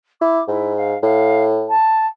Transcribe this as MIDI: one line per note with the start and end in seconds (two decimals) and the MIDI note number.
0.21 0.41 64
0.21 0.43 86
0.48 0.95 44
0.48 0.74 64
0.77 1.01 77
1.03 1.74 45
1.03 1.43 77
1.69 2.06 81